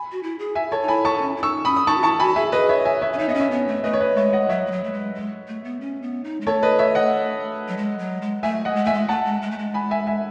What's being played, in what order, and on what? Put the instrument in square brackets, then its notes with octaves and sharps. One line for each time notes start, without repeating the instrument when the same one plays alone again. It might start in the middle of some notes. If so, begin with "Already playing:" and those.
Already playing: [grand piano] G#5 B5
[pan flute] F#4
E4
G#4
[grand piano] E5 G#5
A4 C#5
[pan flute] D#4
[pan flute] E4 [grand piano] G#5 B5
[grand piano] A5 C#6
[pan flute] D#4
C#4
E4
[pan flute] D#4 [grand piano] C#6 E6
[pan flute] C#4 [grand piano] B5 D#6
[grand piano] D#6
[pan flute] D#4 [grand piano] A5 C#6
[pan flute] F#4
[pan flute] E4 [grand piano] A5 C#6
[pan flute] F#4 [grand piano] G#5 B5
[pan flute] G#4 [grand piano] E5 G#5
[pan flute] G#4 [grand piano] B4 D#5
[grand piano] C#5 E5
E5 G#5
C#5 E5
[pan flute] C#4
[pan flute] D#4 [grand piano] E5
[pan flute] B3 [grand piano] D#5
[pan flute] C#4
[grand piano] C#5 E5
[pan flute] B3
A3
[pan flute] A3 [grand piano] B4 D#5
[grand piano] C#5
B4 D#5
[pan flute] G#3 [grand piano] C#5 E5
[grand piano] D#5 F#5
[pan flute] F#3 [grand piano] C#5 E5
[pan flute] G#3
F#3
A3
G#3
G#3
A3
B3
C#4
B3
D#4
G#3
[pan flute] A3 [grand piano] A4 C#5
[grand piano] B4 D#5
C#5 E5
D#5 F#5
[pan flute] F#3
G#3
F#3
G#3
[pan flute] A3 [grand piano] E5 G#5
[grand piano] D#5 F#5
[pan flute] G#3
[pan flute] A3 [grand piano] E5 G#5
[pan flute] G#3
[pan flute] A3 [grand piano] F#5 A5
[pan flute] G#3
G#3
A3
G#3
[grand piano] G#5 B5
E5 G#5
E5 G#5